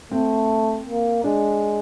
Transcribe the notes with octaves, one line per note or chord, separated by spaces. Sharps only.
A3 C4
A#3
G#3 D4